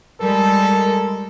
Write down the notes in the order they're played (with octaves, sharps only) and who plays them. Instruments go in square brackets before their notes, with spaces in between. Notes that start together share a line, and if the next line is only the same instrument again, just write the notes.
[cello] G3 G#3 [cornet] A4 [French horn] A#4